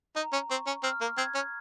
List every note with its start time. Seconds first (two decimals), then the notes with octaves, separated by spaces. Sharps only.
0.16 D#4 A#5
0.33 C#4
0.49 C4 C#6
0.67 C#4
0.83 C4 F6
1.01 A#3
1.17 C4 G#6
1.35 C#4